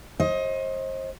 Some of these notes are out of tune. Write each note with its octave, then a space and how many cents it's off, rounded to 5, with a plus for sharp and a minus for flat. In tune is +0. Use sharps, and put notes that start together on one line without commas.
C5 +35 D#5 +20